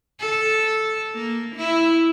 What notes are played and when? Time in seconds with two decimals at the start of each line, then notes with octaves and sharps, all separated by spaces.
0.20 A4
1.15 A#3
1.56 E4